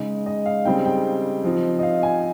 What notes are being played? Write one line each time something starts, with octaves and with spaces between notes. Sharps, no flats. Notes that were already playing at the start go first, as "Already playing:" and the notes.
Already playing: C#3 G#3 D#4
D#5
F5
C#3 G3 C4 D#4 G5
G5
F3 C4 D#4
D#5
F5
G#5